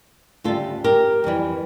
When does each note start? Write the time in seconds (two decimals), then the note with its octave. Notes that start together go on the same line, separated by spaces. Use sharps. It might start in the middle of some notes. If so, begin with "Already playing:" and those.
0.44 D2 C#3 G3 F4 A4
0.84 G4 A#4
1.24 F2 E3 G3